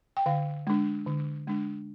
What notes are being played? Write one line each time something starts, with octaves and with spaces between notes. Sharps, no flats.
G5
D3 F5
G#3 D4
D3
G#3 D4